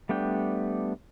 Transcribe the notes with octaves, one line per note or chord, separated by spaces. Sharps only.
G3 A3 B3 D4 G5